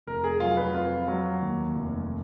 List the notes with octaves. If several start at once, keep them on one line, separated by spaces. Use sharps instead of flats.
F1 A#4
G#4
F#3 F4
B4
F2 F4
F#3
D#2
F1